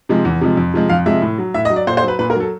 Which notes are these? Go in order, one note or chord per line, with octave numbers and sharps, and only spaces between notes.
C3 F3 G#3
E2
C3 F3 G#3
F2
C3 F3 G#3
F2 F5
C3 F3 G#3 E5
A2
F#3
A2 E5
D#5
F#3
D5
A#2 C5
C5
F#3 B4
A#2 B4
A#4
F#3 A4